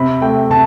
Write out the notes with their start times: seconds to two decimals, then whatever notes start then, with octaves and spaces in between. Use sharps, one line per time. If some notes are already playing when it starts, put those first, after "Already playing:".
Already playing: C3 B5
0.21 A3 G5
0.50 C3 A5